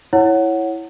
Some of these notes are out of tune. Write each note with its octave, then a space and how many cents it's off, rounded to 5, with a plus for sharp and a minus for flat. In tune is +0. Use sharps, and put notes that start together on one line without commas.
E4 +0 C#5 +0 F#5 +0